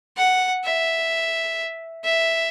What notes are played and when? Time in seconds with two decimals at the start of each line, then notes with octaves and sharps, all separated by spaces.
0.17 F#5
0.63 E5
2.04 E5